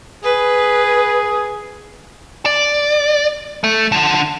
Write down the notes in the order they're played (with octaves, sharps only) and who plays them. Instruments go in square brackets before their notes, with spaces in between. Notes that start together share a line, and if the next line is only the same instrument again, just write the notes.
[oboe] G#4 [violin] B4
[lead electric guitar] D5
A3
D3 F3